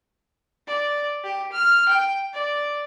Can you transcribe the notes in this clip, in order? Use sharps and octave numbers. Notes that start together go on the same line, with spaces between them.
D5
G4
F6
G5
D5